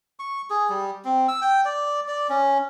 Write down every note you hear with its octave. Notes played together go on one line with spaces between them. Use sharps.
C#6
G#4
G3
C4
E6
G5
D5
D5
C#4